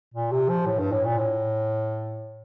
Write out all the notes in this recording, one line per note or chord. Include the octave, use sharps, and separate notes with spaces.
A#2
C3
F3
A2
G2
A2
A#2
A2